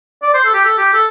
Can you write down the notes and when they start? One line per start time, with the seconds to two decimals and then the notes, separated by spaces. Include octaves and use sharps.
0.23 D5
0.34 C5
0.45 A4
0.54 G4
0.64 A4
0.78 G4
0.93 A4